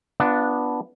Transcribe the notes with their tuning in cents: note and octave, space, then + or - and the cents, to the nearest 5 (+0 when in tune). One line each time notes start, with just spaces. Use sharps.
B3 -5 D4 +0 F4 -30